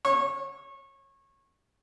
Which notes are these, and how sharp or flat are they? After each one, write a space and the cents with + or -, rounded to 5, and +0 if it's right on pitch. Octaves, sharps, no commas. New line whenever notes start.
C#5 -25